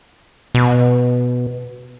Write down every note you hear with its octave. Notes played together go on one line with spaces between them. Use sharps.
B2